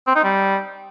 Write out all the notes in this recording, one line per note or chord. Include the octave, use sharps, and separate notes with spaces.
C4
D#4
G3